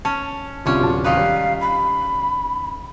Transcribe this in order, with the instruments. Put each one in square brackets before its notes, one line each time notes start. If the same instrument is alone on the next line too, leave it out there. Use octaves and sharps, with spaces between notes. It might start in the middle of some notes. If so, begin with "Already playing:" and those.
[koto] C#4 [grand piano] A5
[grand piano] C2 [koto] D3 C#4 [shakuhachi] F4
[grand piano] D1 C3 A5
[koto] D#3 D#4 B4 [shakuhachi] F5
[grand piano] G3
[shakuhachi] B5